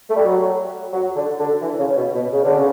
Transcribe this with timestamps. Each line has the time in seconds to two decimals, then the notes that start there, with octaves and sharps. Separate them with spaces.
0.09 A3
0.16 G3
0.23 F#3
0.92 F#3
1.16 D3
1.39 D3
1.62 E3
1.79 C#3
1.96 B2
2.14 B2
2.32 C#3
2.44 D3
2.57 C#3